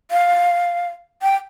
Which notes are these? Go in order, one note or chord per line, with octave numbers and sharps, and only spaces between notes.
F5
G5